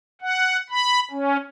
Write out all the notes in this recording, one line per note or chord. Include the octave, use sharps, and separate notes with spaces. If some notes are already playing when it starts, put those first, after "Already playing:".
F#5
B5
C#4